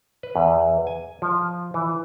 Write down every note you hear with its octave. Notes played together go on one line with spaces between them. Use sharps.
B4
E2
G#5
F3
E3